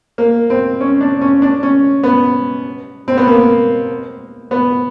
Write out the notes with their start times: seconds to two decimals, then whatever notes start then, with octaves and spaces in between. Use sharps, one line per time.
0.18 A#3
0.50 C4
0.81 C#4
1.01 D4
1.21 C#4
1.42 D4
1.63 C#4
2.03 B3
3.08 C4
3.17 B3
3.27 A#3
4.51 B3